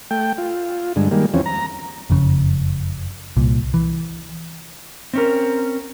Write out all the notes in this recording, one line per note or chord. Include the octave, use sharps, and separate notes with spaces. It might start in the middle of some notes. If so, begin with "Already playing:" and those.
A3 G5
F4
G2 D3 G#3
D#3 G3 G#3 A#3
E2 F3 C4 C#4
A#5
F#1 F2 C#3
C2 A#2
E3
C4 C#4 A#4